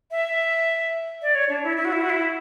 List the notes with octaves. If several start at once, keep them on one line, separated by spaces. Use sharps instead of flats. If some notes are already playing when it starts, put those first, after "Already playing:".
E5
D5
C#5
D4
E4
E4
F#4
E4
F#4
E4